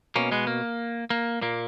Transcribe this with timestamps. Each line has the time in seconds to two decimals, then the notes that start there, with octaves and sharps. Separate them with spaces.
0.16 B2 A#3 C#4
0.32 G#3 B3
0.47 A#3
1.10 A#3
1.41 A#2 A#3